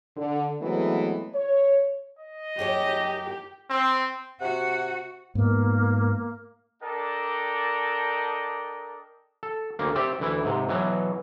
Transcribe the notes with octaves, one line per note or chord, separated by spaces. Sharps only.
D3
E3 F#3 G#3 A3 B3 C4
C#5
D#5
F#2 G4 G#4 C#5
C4
C3 F#4 F#5
G#2 A#3 B3
D4 A4 A#4 D5 D#5 G5
A4
D2 A#3
C4 G4 D5 E5 G5
D2 E3 E4
G#2 C3
B2 E3 F#3